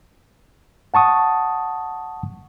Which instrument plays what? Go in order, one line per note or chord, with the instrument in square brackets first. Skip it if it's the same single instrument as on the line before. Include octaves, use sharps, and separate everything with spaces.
[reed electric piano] F#5 A5 C#6 D#6